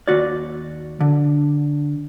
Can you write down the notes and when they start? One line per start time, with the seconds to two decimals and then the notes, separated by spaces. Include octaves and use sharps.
0.08 D#2 F#4 D5
1.01 D3